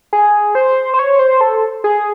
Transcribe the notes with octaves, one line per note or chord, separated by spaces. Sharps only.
G#4
C5
C5
C#5
C5
A4
G#4